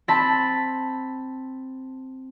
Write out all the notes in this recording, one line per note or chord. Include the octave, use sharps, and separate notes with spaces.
C4 A5 B5